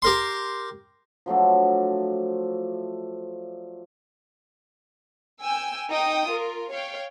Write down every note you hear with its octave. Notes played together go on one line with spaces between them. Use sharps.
G4 A#4 C6
F3 F#3 A3 D4
G5 G#5 E6
D#4 G5 D#6
F4 A#4
C#5 F5 G5